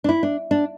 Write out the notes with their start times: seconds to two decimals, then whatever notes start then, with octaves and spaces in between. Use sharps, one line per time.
0.04 D4
0.09 E4
0.23 D4
0.51 D4